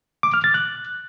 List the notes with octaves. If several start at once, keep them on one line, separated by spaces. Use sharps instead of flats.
D6
F6
A6
F#6